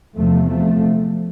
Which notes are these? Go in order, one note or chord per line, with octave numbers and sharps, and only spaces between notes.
E2 C3 F3 A3
F3 A3